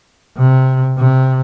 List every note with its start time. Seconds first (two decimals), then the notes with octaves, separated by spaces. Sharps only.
0.37 C3
0.98 C3